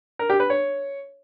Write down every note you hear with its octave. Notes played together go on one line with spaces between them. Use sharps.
A#4
G4
B4
C#5